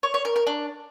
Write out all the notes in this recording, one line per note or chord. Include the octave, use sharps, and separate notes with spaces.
C#5
C#5
A#4
A#4
D4